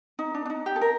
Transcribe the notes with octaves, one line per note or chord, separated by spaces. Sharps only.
D#4
D4
D4
D#4
G4
A4
A#4